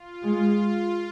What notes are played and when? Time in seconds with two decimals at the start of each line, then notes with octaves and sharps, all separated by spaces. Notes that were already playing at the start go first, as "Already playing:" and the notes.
Already playing: F4
0.23 G#3